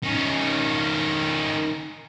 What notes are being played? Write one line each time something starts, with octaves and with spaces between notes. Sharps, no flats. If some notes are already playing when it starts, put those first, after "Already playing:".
D#3 C#4